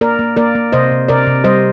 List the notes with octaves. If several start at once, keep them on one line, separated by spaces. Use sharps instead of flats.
A#3 A#4 D5
A#3
A#3 A#4 D5
A#3
C3 C5 D#5
C3
C3 A#4 D5
C3
G3 C5 D#5